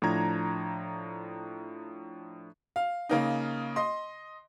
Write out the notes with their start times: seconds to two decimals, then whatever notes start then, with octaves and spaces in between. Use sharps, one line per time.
0.02 A2 F3 D4 A#5 G#6
2.76 F5
3.09 C#3 A#3 D#4
3.76 D#5 C6